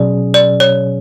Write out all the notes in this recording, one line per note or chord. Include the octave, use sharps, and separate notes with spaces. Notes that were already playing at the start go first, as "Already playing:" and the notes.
Already playing: B2 F#3 C#4 G#4 D5
D5
C#5